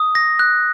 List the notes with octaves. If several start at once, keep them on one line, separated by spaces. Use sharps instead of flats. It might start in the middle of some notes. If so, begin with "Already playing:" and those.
Already playing: D#6
A#6
F#6